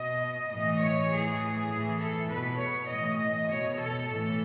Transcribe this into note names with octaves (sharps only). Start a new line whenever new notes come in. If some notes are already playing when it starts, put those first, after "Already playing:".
Already playing: B2 D#5
A2 E3 D#5
C#5
A2 E3 G#4
A2 E3
A4
B2 B4
C#5
A2 E3 D#5
B2 C#5
A4
A2 E3 A4